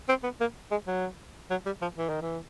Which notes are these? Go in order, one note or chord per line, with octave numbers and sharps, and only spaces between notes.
C4
B3
A#3
G#3
F#3
F#3
G3
F3
E3
D#3
E3